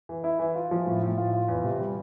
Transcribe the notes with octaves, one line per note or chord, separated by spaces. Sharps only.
E3
E4
E3
F4
F3
A2
A2
F4
F4
E2
C3
G3